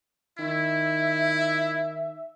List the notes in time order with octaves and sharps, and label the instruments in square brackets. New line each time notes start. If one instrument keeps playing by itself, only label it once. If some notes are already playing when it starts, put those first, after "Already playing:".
[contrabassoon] D#3 [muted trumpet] E4 [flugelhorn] E5